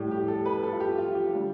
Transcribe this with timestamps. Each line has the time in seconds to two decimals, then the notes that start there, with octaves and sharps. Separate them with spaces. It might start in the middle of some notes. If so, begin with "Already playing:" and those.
Already playing: A2 G3 G4
0.11 G4
0.28 A4
0.46 B4
0.63 A4
0.73 F4
0.80 G4
0.98 F4
1.15 G4
1.34 D3 G3